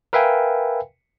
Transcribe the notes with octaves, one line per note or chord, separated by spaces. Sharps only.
A#4 B4 E5 F5 G5 G#5